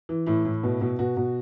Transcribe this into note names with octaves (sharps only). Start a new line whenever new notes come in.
E3
A2 E4
A2
B2
B2
B2 F#4
B2